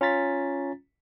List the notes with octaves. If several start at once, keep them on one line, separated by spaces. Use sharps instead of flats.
C#4 F4 A#5 A6 B6